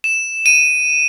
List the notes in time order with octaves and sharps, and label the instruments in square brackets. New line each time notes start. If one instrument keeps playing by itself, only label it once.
[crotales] E7
D#7